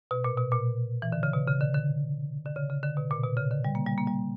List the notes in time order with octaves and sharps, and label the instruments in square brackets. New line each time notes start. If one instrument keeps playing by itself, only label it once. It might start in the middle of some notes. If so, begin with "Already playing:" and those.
[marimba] B2
A#2
B2
A#2
E3
D3
C#3
B2
C#3
D3
D3
D3
C#3
C#3
D3
B2
A#2
B2
C#3
D3
G3
A#3
G3
A#3
G3